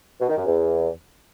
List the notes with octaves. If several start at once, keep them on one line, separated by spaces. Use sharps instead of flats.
B2
D#3
F#2
E2